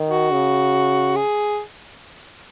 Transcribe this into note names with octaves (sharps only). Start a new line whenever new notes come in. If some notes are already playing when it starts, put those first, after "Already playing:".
Already playing: D#3
F#4
C#3
G#4